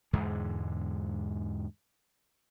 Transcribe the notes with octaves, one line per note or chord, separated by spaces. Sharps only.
E2 G#2 D3 G#3